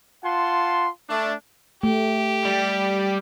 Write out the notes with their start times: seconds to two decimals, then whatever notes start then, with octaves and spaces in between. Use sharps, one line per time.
0.23 F4 F#5 A5 C6
1.09 A3 D4
1.83 A3 G4
2.45 G3